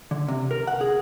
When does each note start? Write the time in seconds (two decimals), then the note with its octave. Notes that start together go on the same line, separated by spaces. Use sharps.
0.11 D3
0.28 C3
0.51 A#4
0.67 F#5
0.81 G#4